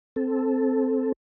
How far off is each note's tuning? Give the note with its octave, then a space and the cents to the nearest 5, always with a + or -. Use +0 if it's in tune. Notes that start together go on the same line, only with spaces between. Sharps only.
C4 +0 A4 -5